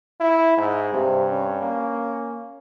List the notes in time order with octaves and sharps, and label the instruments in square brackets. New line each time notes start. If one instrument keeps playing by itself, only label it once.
[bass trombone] E4
G#2
[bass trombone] G2 [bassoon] C3
[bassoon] C#4
[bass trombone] A#3